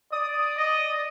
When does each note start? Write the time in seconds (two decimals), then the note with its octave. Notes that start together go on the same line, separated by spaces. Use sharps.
0.12 D5 D#6
0.57 D#5